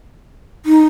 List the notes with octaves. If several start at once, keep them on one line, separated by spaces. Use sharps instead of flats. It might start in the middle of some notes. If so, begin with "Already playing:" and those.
D#4